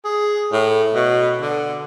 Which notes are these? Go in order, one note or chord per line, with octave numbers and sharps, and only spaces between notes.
G#4
A2
B2
D3